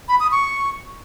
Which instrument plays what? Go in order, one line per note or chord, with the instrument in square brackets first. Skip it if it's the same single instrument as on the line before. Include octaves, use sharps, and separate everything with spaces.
[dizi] B5
D#6
C#6